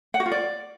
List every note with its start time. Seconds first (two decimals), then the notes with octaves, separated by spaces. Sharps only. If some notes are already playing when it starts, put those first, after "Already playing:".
0.14 F#5
0.20 F#4
0.26 F4
0.31 D5